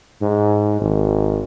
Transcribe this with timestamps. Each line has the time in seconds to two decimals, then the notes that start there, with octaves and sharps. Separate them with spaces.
0.22 G#2
0.81 G#1